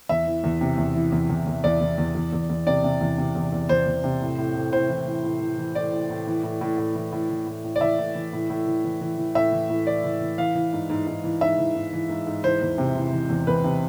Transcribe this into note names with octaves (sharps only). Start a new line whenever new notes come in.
E2 E5
E3
E2
C3
E2
E3
E2
E2
E2
E2 D5
E2
E2
E2
E2
E2
C3 D5
C3
E2
C3
E2
E2
E2 C5
E2
C3
A2
A2
A2
A2 C5
E3
E3
A2
E3
E3
A2 D5
A2
A2
E3
A2
A2
A2
E3
A2
E3
A2
A2
D5
E3 E5
A2
E3
A2
A2
E3
E3
E3
E3
A2 E5
E3
A2
E3 D5
E3
E3
E3 F5
E3
G#2
G#2
G#2
E3
G#2 E5
E3
G#2
E3
G#2
G#2
E3 C5
E2
C3
E3
E3
E2
E2 B4
C3